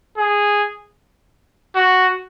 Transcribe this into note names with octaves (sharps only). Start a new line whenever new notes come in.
G#4
F#4